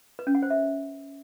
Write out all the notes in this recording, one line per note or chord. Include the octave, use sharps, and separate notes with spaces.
B4
C#4
F#5
C5
E5